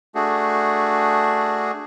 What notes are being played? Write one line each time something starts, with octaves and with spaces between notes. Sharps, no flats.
A3 D4 F#4 G#4